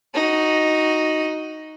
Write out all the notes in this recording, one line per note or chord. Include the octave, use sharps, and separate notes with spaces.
D#4 F#4